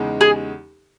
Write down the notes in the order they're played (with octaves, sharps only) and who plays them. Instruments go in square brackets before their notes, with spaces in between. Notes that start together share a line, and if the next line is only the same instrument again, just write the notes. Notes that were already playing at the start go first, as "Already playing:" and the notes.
Already playing: [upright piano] E2 C#3 G#3 D#4
[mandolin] G#4